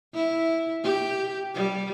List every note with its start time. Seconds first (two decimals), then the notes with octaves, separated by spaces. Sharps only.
0.14 E4
0.84 G4
1.55 G3